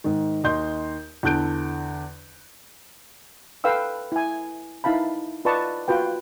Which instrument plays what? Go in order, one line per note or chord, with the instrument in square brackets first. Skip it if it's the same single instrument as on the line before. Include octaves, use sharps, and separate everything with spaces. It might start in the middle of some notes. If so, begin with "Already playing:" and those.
[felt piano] G#2 D#3
D#2 D#5 C6 G6
E2 D3 A5 F#6 G6 D7
[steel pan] A4 B4 F5 G5 E6
E4 G#5
D#4 E4 F5 A5 B5
F4 B4 D5 D#5 A5 C#6
F4 F#4 B4 G5